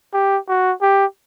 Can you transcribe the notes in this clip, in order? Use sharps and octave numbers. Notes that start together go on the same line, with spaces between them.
G4
F#4
G4